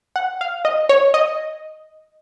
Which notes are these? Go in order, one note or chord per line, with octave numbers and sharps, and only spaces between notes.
F#5
F5
D#5
C#5
D#5